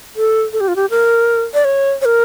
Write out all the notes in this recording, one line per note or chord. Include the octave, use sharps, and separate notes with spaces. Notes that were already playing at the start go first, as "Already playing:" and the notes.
A4
A4
G4
F4
G4
A#4
D5
C#5
C#5
A#4